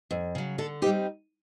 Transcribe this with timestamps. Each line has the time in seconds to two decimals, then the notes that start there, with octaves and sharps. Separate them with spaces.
0.11 F2
0.35 C#3 F#3
0.58 D3 A4
0.82 G3 C4 D#4 G4